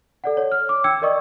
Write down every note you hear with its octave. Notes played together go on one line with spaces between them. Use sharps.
A4 D5 F#5
C#5
F6
D6
G5 E6 G#6 C#7
A#4 D5 D#5 C#6 D#6